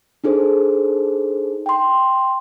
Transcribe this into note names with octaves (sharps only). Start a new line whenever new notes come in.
D4 D#4 G#4 A4 C5
G5 C6